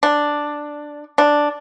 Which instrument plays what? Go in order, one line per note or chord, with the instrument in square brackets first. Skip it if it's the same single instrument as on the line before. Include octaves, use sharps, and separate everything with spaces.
[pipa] D4
D4